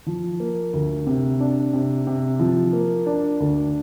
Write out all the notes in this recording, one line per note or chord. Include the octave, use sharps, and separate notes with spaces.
F3
A#3
D2
C3
D4
C3
C3
F3
A#3
D4
D2